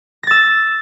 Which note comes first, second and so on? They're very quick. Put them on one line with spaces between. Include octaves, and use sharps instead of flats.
A#6 A6 E6